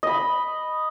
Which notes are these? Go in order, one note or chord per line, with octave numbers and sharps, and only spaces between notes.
D#5 B5